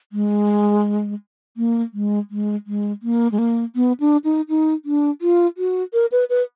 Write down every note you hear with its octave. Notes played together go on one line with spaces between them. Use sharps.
G#3
A#3
G#3
G#3
G#3
A#3
G#3
A#3
B3
D4
D#4
D#4
D4
F4
F#4
A#4
B4
B4